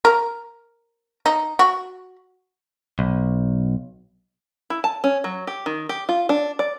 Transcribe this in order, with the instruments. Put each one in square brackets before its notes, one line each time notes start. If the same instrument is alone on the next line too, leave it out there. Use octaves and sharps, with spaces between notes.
[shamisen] A#4
D#4
F#4
[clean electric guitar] B1
[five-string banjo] E4
A5
C#4
F#3
G4
D#3
G4
F4
D4
D5